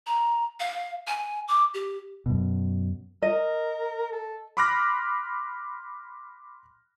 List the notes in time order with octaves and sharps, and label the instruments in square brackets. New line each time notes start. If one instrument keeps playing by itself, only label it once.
[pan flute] A#5
F5
G#5
D6
G4
[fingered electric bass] F#2 B2
[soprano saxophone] A#4 [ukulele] D#5
[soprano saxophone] A4
[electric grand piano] B5 C6 D6 F6 F#6 A#6